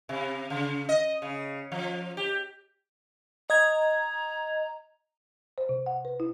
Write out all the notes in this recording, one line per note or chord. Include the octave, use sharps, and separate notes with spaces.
C3
C#3
D#5
C#3
F3
G4
D#5 A#5 G#6
C5
C3
F#5
B4
E4